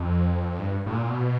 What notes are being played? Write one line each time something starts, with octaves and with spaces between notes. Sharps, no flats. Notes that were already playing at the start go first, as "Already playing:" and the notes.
Already playing: F2
G2
A2
A#2
B2